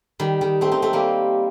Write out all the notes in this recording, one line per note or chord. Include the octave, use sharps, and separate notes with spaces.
D#3 G3
D#3
A3 C4
C4 D#4
A3 C4
G3 A#3